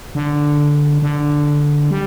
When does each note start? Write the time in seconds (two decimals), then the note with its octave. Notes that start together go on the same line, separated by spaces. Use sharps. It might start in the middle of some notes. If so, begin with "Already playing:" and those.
0.15 D3
1.02 D3
1.91 G3